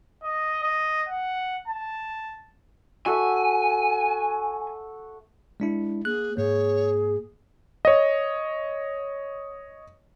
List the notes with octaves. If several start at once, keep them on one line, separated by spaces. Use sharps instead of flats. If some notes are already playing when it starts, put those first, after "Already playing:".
D#5
D#5
F#5
A5
F#4 A4 E5 G#5
G#3 D4 E4
A#3 G#4 F#6
G#2 A#3 G#4 C#5
C#5 D#5